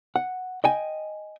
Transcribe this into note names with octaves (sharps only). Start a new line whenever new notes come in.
F#5
D#5 G5 G#5